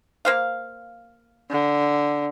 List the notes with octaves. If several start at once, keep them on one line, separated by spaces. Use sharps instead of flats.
A#3 C5 F5
D3